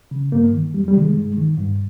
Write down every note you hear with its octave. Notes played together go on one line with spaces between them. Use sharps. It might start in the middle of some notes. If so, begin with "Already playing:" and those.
C#3
G2 A#3
D#3
F2 G3
G3
C3 D#3
G#3
G2
D#3
G2